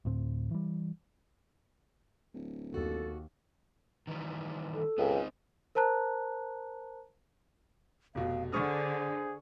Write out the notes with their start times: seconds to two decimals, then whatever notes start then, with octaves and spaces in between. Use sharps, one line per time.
0.05 D2 A2 C4
0.51 E3 G3
2.34 D1
2.74 D#2 F#4 A4
4.07 D#3 E3 G3
4.74 A4
4.98 C#2 B3 C4 G4
5.15 C4 D#4
5.75 A#4 C5 A5 A#5 F#6
8.15 F1 B2 F5
8.52 D3 G#4 C5 C#6 D#6 F6